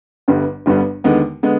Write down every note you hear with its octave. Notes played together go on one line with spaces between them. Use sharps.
G1 G2 D3 G3 B3
G1 G2 D3 G3 B3
D#2 D3 G#3 B3
D3 G#3 B3